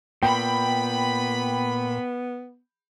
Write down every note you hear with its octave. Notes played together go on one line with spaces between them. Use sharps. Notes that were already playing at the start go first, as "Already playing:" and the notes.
A#2 B3 G5 B5